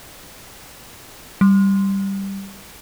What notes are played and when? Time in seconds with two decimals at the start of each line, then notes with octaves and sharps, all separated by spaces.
1.41 G3